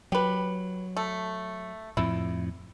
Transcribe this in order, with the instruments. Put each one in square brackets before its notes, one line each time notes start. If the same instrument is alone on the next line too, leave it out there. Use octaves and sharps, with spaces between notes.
[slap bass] F#3 [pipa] G4 B4
[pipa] A3
[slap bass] F2 A2 [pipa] E4